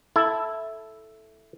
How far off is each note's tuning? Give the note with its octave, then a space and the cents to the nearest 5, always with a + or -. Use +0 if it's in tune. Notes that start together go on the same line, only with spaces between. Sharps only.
E4 +0 A4 +0